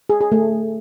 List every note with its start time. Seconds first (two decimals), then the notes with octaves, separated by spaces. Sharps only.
0.09 G#4
0.21 G#4
0.32 A3